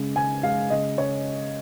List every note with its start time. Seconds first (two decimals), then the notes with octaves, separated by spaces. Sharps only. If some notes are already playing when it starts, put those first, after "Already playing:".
Already playing: C#3 G#3
0.16 C#3 G#5
0.43 G#3 F5
0.70 C#3 D#5
0.98 C#3 C#5